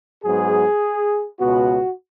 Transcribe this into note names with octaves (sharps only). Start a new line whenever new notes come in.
G#2 F#3 B3 G#4
C#2 B2 B3 F#4